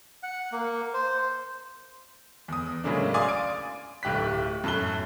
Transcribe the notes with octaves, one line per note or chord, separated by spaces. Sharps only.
F#5
A#3
C5
E2 D#6
A2 C#3 F#3 G#3 A#3 D4
D5 F5 G#5 C6 D6 D#6
A6 D7
D1 A2 G4 F#6 B6
F#2 A2 A5 F#6 G7